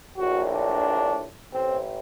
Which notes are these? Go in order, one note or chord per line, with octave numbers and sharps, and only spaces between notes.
A#1 A2 F#4
D4
A1 A2 C4